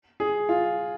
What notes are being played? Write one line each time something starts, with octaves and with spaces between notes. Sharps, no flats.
G#4
F4